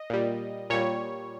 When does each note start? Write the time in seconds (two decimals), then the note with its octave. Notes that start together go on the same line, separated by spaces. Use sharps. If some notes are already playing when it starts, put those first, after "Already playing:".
Already playing: D#5
0.10 A#2 G3
0.70 A#2 G3 C#5